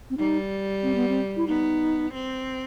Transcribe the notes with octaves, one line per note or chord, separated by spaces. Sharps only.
C4
G3 D#4
C4
B3
C4
E4
B3 D#4
C4